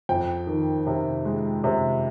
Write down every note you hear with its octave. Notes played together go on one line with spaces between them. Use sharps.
F2 G5
D#3
C3
G#3
C3